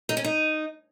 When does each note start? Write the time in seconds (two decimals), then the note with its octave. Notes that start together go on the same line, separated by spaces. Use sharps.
0.09 D#4
0.17 C#4
0.24 D#4